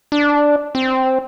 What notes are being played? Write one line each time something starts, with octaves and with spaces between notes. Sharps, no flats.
D4
C4